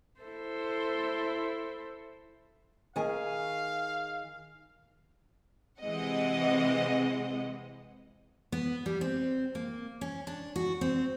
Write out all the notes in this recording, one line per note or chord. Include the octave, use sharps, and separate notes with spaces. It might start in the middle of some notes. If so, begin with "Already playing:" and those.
E4 A4 C5
D#3 G#4 F5 G#5
C3 E3 G#3 C4 D#5 F#5
B3
G3
C4
A#3
C#4
D4
F#4
C4